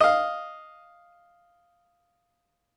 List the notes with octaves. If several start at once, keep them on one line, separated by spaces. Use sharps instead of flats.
D#5 F5